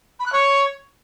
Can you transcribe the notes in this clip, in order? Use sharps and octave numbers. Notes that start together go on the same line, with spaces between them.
B5
F#6
C#5